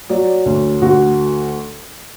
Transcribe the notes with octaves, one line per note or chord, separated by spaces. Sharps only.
F#3 D5
D2
D2 F#4